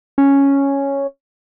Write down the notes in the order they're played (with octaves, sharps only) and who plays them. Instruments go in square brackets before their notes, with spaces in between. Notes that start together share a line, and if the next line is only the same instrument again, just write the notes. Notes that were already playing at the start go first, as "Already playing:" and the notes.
[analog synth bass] C#4